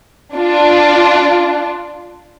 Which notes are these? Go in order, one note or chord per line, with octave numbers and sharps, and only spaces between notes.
D4 F4